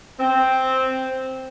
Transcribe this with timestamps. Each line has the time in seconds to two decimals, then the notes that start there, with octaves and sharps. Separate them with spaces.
0.19 C4